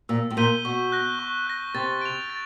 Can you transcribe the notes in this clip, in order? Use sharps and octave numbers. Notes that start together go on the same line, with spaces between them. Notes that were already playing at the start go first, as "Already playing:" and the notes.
A#2 E6
A2
A#2 G6 B6 D#7 G7
B2 C#6
F#6 A#6
C#6
F#6 A#6
C3 A6
D7 F7
A6